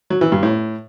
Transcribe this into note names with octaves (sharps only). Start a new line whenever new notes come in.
F#3
E3
G2
A2